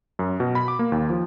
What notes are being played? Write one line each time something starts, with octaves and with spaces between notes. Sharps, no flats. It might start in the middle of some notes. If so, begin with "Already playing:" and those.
F#2
B2
B5
D6
A#3
D#2
F3